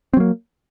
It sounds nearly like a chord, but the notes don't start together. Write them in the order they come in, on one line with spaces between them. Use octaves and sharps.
C4 F#3 A#3